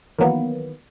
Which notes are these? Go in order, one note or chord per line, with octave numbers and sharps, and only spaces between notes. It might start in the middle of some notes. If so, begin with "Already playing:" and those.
D#3 E3 F#3 A#3 B3